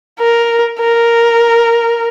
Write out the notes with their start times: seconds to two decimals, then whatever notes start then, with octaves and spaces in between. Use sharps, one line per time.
0.20 A#4
0.80 A#4